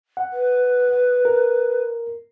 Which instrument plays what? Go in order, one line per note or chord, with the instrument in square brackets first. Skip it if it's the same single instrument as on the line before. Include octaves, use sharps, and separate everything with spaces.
[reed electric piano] F#5
[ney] B4
[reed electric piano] A#4